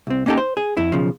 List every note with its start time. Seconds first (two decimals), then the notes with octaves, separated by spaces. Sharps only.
0.07 C2 C4
0.26 A#3 C#4 D#4 G4 A4
0.37 C5
0.57 G#4
0.77 F2 E4
0.92 B1 C#3 F3